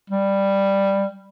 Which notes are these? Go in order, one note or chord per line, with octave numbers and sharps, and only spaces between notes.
G3